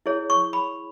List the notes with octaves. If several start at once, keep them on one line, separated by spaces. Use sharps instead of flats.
E4 G#4 C#5
C#6
B5